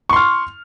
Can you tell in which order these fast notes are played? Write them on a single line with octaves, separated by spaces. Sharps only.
C#6 C6 F6